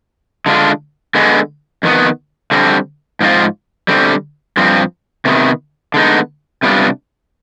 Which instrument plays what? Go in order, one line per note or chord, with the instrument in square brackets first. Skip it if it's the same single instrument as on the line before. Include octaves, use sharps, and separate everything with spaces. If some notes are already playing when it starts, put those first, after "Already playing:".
[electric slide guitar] D3 G#3 D4 F4
D3 G#3 B3
F2 D#3 B3
D3 G3 C4
G#2 F3 C4 F4
D3 G3 C4
G2 F3 C4
C3 D#3 B3
D3 G#3 B3 D#4
C3 G3 B3 D4 F4